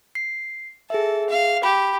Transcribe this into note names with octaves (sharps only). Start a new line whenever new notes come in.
C7
G#4 A4 E5
F5
G4 B5